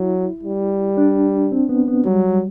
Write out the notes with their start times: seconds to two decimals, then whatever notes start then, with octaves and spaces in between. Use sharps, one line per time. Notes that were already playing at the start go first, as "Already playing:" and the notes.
Already playing: F#3 E4
0.43 G3
0.98 D4
1.52 C4
1.69 B3
1.88 B3
2.05 F#3 G3